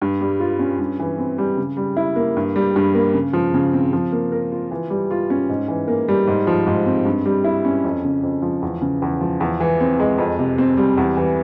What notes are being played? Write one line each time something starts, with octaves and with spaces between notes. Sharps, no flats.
G2
G3
F4
C#4
G2
E3
C4
G3
C#3
G3
E4
A#3
G2
G3
G2
A#3
C#3
F3
C#3
C4
F3
A#3
A#4
F4
E3
G3
F4
C#4
G#2
E3
A#3
G3
G#2
F3
G#2
C4
G2
G3
E4
C#4
F2
C#3
F2
F3
E2
C#3
E2
F3
E2
E3
C4
G#3
F2
C3
C4
G3
E2
E3